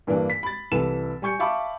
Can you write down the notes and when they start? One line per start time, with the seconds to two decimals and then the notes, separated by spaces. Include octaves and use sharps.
0.07 G2 E3 A#3 D4
0.30 B6
0.43 B5 A6
0.71 C2 E3 A4 E7
1.22 G3 G#5 C#6 G6 C#7
1.39 E5 F5 A5 B5 C#6 D6